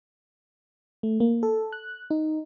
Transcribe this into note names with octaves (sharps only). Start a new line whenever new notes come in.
A3
A#3
A4
F#6
D#4